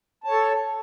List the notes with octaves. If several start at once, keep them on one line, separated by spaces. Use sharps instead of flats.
A4 C#5 A5